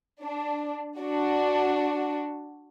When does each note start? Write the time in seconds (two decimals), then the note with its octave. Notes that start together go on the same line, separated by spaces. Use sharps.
0.22 D4
1.00 D4 F#4